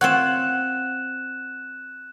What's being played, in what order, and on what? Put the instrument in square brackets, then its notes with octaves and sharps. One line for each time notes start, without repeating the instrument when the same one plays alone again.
[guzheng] C4 F4 C#5 [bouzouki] F#5 [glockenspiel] F#6 E7